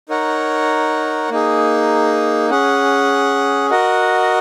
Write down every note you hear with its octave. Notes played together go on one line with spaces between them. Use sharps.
D#4 A#4 C#5 F#5
A#3 D#4 G#4
C#4 G#4 F#5
F#4 A#4 D#5 F#5